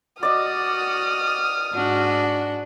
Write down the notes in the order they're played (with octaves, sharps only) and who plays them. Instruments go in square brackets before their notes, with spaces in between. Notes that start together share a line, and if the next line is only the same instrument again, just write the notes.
[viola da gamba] F#4 [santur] D5 D#5 [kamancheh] D#6 F6
[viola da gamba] G#2 D4 F#4